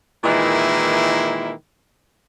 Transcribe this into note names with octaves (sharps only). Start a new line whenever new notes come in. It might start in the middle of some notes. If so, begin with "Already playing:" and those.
A#2 D#3 E3 G#3 E4